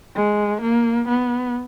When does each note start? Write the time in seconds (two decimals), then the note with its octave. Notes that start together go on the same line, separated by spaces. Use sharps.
0.15 G#3
0.61 A#3
1.08 B3